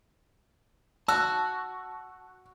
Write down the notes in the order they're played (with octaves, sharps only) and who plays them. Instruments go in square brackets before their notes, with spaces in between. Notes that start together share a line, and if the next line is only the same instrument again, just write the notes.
[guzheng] F#4 [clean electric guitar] A5 [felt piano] E6